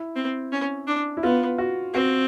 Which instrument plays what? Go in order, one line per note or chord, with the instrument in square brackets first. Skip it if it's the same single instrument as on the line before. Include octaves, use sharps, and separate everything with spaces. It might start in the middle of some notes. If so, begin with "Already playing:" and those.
Already playing: [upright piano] E4
[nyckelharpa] C4
C#4
D4
[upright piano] E4
[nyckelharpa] B3 [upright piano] F4
[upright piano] F#4
[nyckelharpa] C4 [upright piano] F#4